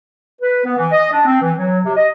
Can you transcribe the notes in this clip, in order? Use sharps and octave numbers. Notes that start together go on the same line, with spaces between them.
B4
B3
E3
D#5
D4
C4
E3
F#3
C3
D#5